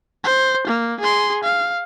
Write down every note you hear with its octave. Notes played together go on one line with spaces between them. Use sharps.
C5
A#3
G#4 C6
F5